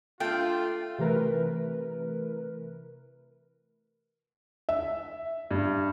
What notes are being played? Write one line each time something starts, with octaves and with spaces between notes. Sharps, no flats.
A3 D4 F4 G5
C3 E3 A3 A#4 B4
E5
G2